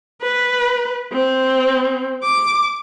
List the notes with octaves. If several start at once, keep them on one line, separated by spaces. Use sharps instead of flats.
B4
C4
D6